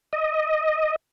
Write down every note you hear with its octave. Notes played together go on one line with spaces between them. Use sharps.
D#5